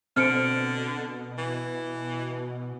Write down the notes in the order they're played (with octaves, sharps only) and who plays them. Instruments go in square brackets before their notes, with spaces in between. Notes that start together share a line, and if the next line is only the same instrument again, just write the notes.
[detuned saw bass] B2 [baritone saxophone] D3 [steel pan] C4 [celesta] F6 C#7 D7
[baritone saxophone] E3